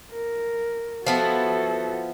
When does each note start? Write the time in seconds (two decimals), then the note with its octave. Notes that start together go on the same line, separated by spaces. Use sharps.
0.11 A#4
1.06 F3 B3 E4 F#4 A4